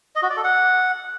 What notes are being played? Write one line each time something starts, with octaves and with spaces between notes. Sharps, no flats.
D#5
F#4
D5
A4
F#5